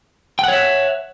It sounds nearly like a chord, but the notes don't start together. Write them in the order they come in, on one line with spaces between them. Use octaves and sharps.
G5 F#5 C#5 E5